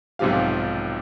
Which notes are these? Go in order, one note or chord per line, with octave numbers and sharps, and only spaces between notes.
B1 G#2 C3 F3 G4 F5